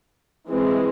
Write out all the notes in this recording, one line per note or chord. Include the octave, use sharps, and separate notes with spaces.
E3 G#3 C4